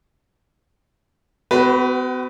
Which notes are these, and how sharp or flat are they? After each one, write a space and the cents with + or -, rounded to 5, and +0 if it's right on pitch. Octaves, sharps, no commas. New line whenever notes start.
B3 +45 F#4 +30 B4 -5